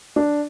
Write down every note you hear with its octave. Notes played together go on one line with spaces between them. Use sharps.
D4